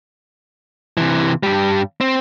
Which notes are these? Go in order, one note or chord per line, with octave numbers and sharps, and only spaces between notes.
C3 E3
G2 G3
C4